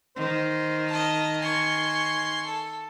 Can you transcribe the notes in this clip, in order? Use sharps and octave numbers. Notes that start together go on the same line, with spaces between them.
D#3 C5
D#5 A5
G#5 C6 C#6
A4